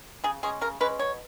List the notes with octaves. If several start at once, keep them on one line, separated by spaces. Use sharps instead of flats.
C#3 G#4
G#3 C#4 G#4
C#3 A#4
G#3 C#4 B4
B2 C#5